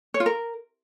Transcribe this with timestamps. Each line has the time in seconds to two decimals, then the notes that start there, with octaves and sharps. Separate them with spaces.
0.14 C#5
0.20 F4
0.26 A#4